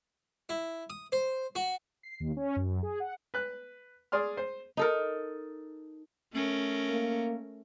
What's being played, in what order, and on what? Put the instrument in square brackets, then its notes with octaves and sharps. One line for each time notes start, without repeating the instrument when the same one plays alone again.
[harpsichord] E4
D#6
C5
F#4
[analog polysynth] C7
D#2
C#4
F#2
G#4
F#5
[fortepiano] B4 F#6
G#4 D5 C6 F6
C5
[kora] D#4 A4 A#4
[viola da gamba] A3 C#4 A#4
[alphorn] A#3